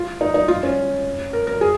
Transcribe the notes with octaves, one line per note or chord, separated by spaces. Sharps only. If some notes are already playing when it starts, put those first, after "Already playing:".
Already playing: F4
D#4
D#4
F4
C#4
A#4
A#4
G#4